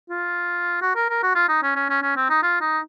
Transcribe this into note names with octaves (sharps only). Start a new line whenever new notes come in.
F4
F#4
A#4
A#4
F#4
F4
D#4
C#4
C#4
C#4
C#4
C4
D#4
F4
D#4